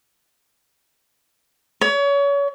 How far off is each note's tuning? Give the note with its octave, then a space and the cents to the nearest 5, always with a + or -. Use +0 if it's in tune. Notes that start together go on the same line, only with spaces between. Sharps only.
C#5 +30